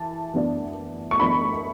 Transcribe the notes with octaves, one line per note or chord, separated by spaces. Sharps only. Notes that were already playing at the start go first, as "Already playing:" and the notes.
Already playing: E3 A5
E3 B3 D4
C#6
E3 B3 D4 B5